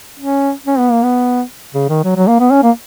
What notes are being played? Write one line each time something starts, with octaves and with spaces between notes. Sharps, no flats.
C#4
C#4
B3
A#3
B3
C#3
D#3
F#3
F#3
A#3
B3
C#4
A#3